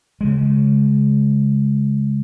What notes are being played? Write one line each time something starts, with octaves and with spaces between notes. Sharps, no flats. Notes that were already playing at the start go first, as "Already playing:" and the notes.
C#3 G#3